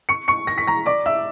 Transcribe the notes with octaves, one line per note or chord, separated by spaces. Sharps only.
C#6 C#7
C#6 C#7
A#6
B6
A#5 A#6
D5 D6
E5 E6